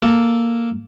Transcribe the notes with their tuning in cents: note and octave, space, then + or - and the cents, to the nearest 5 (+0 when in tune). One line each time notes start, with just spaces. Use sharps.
A#3 +0 A4 +0